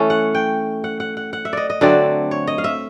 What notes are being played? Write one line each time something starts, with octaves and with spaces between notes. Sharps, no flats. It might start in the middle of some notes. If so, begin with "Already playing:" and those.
Already playing: E3 A3 C#4
F#5
G5
F#5
F#5
F#5
F#5
E5
D5 D#5
D#5
D3 F#3 A3 C4 D5
C#5
D#5
F5
E5